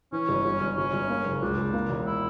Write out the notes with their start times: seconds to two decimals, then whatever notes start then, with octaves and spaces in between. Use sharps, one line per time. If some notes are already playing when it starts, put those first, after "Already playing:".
0.12 E3 C#4
0.29 G1
0.45 G1
0.61 G1
0.77 G1 C#4
0.93 G1
1.09 A#3
1.26 F#1
1.42 C#2 D4
1.57 C#2
1.73 A#3
1.90 E1
2.06 E4